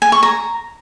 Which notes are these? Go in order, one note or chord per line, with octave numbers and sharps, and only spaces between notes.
G#5
C#6
A#5